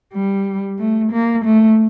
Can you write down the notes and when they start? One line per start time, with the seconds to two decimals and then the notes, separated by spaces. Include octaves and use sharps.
0.14 G3
0.79 A3
1.12 A#3
1.44 A3